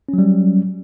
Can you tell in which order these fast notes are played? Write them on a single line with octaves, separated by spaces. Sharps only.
C#4 F#3 G3